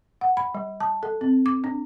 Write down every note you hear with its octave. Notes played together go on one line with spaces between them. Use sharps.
F#5
B5
G3
A5
A4
C4
D6
D4